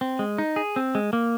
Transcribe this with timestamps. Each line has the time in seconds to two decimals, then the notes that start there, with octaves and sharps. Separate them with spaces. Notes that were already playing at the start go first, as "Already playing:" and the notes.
0.01 C4
0.19 G#3
0.38 D#4
0.56 G#4
0.76 C4
0.95 G#3
1.13 A#3